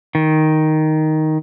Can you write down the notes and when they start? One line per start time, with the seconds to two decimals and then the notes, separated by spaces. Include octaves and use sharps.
0.15 D#3